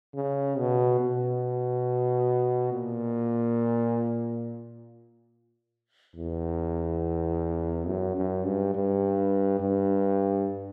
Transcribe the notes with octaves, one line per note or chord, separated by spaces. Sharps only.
C#3
B2
B2
A#2
E2
F#2
F#2
G2
G2
G2